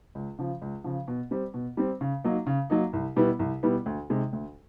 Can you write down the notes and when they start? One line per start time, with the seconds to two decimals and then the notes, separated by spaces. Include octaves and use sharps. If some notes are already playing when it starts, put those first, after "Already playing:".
0.15 C#2
0.38 C#3 F3
0.62 C#2
0.84 C#3 F3
1.08 B2
1.31 G3 C4
1.54 B2
1.77 G3 C4
2.01 C#3
2.24 F#3 A#3 D#4
2.47 C#3
2.70 F#3 A#3 D#4
2.93 C2
3.16 B2 G3 B3 E4
3.39 C2
3.63 B2 G3 B3 E4
3.86 D2
4.10 C3 D#3 G#3
4.33 D2